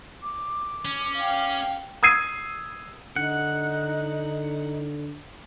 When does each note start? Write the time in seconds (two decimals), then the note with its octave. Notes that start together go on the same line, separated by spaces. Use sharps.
0.22 D6
0.85 C#4
1.16 F5 G5
2.03 D#6 E6 G#6 C7 D#7
3.16 D3 D#4 F#5